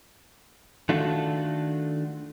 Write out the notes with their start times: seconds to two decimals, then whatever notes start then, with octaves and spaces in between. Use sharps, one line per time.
0.89 D#3 A3 D4 F4 F#4 A4